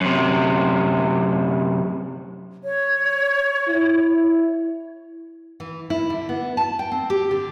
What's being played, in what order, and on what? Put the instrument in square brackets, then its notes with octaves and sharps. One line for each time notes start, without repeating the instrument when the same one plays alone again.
[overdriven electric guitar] F#2 C3
[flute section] C#5
[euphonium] E4
[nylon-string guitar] E3
E4
D3
B3
A5
G5
C4
G4
D3